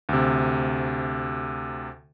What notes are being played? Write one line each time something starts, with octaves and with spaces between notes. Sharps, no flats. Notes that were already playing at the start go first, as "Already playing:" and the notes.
D2 C3